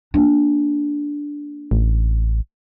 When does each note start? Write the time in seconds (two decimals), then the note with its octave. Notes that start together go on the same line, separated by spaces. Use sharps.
0.14 A#3 D4
1.71 A1